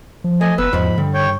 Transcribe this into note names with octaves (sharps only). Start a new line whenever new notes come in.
F3
A3 D#5 G#5
F#1 B3 B4 E6
E2 G#2 F3 B5
G2 D3
C#5 G5